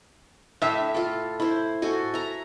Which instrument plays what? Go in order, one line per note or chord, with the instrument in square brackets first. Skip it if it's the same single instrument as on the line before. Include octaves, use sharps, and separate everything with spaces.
[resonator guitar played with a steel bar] A2 E5
[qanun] F4 A4
E4 C5
F#4 A4 G#5
E5 A#5